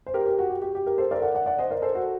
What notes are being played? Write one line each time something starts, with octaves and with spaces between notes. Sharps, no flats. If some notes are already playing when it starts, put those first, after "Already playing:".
C5
G4 A#4
G4
F#4
G4
G4
G4
G4 A#4
A4 C5
A#4 D5
D5 F#5
D5 F#5
D5 F#5
C5 D#5
A#4 D5
A4 C5
F#4